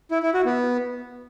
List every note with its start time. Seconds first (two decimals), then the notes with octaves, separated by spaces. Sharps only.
0.11 E4
0.23 E4
0.34 F#4
0.46 B3